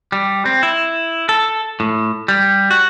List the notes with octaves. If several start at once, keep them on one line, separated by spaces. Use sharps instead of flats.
G3
C4
E4
A4
A2
G3
F#4